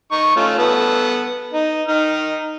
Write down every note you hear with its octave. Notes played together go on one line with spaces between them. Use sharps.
D#4 C#6
A3 C#4 F4
B3 A4
D#4
D#4 F6